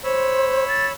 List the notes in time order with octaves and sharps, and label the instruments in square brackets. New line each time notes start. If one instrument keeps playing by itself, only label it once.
[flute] C5 [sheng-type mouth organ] C#5 B5 E6
[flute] A6